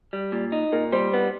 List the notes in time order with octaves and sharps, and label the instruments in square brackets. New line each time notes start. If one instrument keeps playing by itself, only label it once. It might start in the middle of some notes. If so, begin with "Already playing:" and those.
[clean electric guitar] G3
A#2
D#4
[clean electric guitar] A#2 [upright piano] A#4
[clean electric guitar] G3 [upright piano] C5
[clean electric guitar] B3 [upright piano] B4